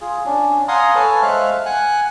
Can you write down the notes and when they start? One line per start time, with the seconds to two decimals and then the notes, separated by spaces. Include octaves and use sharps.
0.01 F4 G#4
0.25 C#4 D4
0.68 F5 F#5 G#5 A#5 C6 D#6
0.95 A4 B4 C#5 G#5 A5
1.22 G#3 C5 E5 F5 F6 F#6
1.66 F#5 G#5 F#6